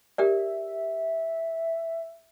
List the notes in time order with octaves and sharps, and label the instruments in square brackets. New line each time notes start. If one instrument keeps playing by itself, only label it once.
[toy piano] G4 A#4 D5 [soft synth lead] E5